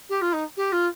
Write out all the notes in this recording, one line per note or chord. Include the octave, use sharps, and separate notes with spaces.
G4
F4
D#4
G4
F4